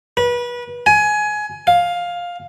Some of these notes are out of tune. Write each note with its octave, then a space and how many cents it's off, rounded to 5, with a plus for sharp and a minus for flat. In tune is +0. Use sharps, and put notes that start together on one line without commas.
B4 -30
G#5 +20
F5 +10